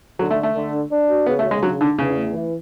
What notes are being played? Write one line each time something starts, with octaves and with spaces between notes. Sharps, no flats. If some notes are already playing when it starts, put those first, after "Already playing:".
D3 F#3
A3
D4
A3
D3
D4
D4
F#4
C#3 B3
A3
C#3
G#3
F#3 D4
D3 D4
E2 C#3
A3
E3